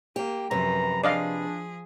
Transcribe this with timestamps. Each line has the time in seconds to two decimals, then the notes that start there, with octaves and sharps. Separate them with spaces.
0.16 A#3 G4
0.51 F#2 C3 F3 B4 A#5
1.04 F3 D4 G#4 D5 D#5 F5